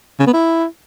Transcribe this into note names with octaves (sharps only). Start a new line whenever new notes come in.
C#3
B3
E4